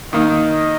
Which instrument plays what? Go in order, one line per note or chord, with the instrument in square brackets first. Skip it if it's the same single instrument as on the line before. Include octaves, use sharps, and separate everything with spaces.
[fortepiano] D#3 A#3 D#4 [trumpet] D#5